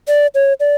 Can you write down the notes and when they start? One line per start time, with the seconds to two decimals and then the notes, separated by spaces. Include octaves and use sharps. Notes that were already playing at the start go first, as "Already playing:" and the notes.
0.08 D5
0.35 C#5
0.60 D5